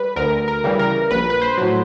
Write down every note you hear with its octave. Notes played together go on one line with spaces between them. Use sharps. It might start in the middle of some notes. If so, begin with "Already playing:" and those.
Already playing: G3 B4
D2 A#4
A#4
C#3 E3 G3
A#4
A#1 B4
B4
C5
A2 F#3